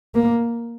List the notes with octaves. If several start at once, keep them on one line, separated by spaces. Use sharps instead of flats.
A#3